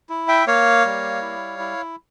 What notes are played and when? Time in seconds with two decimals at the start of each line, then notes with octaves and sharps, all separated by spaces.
0.09 E4
0.28 E5 G5
0.47 A#3 C#5 F5
0.85 G3
1.22 E4
1.59 E4